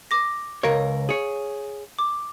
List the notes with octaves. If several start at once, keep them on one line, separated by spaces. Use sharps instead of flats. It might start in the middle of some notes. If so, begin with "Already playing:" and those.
D6 A#6
C#2 A#4 C#5 F5
G#4 C#5
D6